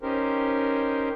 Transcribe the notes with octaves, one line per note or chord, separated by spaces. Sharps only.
C#4 D#4 G4 A#4 C5